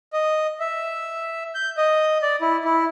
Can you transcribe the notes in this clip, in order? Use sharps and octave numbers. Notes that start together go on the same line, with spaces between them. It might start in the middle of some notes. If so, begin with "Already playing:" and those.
D#5
E5
G6
D#5
D5
E4
E4